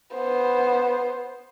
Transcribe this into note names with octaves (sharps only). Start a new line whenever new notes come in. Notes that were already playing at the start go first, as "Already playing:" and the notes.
B3 C5